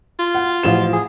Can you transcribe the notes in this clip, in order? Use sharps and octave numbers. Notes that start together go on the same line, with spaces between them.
F4
F#5
A1 F3 E7
G#4